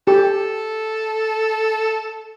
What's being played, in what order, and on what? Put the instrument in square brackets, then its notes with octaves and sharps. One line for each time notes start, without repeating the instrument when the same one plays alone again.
[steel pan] G4 [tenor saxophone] A4